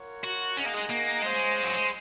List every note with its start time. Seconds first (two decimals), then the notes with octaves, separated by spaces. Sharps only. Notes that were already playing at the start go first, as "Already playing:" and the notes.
Already playing: F4 A#4 C#5 F#5
0.24 F#4
0.57 C#4 D#4 G#4 D#5 F#5
0.65 A#3
0.73 G#3
0.89 A#3
1.22 G#3 C#4 F4 C5 D#5
1.64 F#3
1.76 G#3